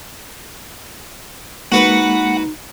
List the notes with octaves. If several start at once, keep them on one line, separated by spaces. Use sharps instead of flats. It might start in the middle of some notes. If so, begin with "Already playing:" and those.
G#3 A#3 D#4 F#4 B4 F#5